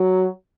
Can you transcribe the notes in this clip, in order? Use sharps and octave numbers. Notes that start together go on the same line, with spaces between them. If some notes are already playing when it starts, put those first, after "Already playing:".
Already playing: F#3